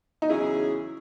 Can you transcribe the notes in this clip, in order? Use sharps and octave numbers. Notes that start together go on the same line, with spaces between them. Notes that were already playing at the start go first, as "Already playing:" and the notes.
D#4
E2 C#3 F#3 C#4 E4 G#4